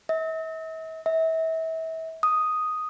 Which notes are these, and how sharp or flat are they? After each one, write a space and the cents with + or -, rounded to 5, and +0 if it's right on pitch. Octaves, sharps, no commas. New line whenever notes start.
E5 -45
E5 -35
D#6 +0